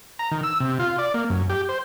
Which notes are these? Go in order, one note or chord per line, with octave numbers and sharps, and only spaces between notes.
A#5
D#3
E6
C3
F4
D5
A#3
F#2
G4
C5